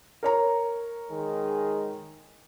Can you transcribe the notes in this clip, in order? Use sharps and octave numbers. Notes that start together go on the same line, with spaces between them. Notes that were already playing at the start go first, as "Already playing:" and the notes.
A#4 C#5 A#5
D#3 G#3 G#4